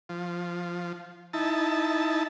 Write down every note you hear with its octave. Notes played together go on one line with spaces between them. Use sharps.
F3
D#4 E4 A5